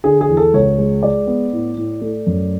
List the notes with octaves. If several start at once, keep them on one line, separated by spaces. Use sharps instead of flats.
D3 G#4
G#4
E2
A4
C#2 C#5
G#3
G#3 D5
B3
A2
A2
A3
F#2